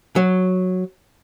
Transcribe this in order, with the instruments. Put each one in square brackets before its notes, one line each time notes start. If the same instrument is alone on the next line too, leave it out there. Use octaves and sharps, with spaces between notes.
[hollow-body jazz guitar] F#3